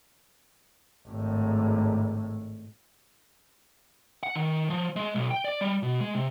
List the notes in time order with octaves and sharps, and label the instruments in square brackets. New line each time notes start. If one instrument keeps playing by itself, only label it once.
[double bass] G#1 A2
[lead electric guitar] F#5
D#3
F3
G#3
B1
G5
D5
G3
B2
G#3
C3